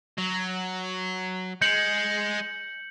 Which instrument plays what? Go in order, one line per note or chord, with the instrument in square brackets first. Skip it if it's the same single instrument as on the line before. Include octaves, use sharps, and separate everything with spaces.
[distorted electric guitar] F#3
[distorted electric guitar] G#3 [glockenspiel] G6 C#7 F#7